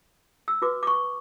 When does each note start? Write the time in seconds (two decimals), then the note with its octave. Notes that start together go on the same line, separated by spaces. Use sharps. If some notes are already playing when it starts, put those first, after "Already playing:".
0.48 E6
0.62 F#4 B4 D6
0.83 D6
0.87 C#6